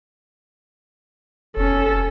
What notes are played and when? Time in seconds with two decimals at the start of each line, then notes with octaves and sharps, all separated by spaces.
1.57 F1 C#4 A4